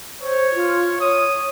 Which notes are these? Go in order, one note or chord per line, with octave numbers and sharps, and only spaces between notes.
C5 C#5
F4
C#5 D#6